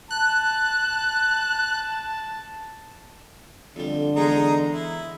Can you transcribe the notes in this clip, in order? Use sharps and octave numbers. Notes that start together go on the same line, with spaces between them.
A5 F#6
F2 D3 G3
E2 G#2 G#3 D#4 G#4 A#5
E4